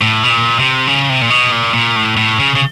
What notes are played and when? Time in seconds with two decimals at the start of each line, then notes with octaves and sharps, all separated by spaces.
0.01 A2
0.24 B2
0.30 A#2
0.59 C3
0.87 C#3
1.09 C3
1.22 A#2
1.30 B2
1.52 A#2
1.73 A#2
1.96 A2
2.17 A2
2.40 C#3
2.55 C#3